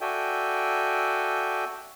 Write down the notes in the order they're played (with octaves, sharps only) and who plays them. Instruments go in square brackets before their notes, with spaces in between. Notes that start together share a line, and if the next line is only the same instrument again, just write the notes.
[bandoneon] F#4 A4 D5 E5 G5 G#5